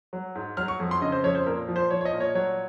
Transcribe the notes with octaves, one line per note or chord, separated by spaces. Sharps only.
F#3
G#2
F#3 F6
C#6
F2
C6
C#3 D#5
C5
F2 C#5
C5
A#2 A#4
F3
C5
F3 C#5
C#5
D#5
A#2
C#5
F#3 C#5